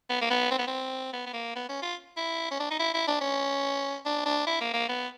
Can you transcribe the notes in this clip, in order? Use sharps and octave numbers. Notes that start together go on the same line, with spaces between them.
B3
A#3
B3
C4
B3
C4
B3
B3
A#3
B3
C#4
F4
E4
C#4
D4
D#4
E4
E4
D4
C#4
D4
D4
E4
A#3
A#3
B3